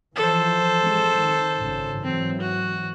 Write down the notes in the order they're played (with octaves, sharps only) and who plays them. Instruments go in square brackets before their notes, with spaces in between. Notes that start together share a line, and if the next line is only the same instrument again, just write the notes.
[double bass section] E3 F3 [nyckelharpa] A4 C5
[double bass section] G#3 C4
D#3
G#1 G#2 C#3
[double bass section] G#2 E3 F#3 [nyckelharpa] C4
[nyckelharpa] F#4